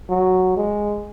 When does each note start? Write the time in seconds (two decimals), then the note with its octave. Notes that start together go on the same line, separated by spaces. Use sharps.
0.10 F#3
0.57 G#3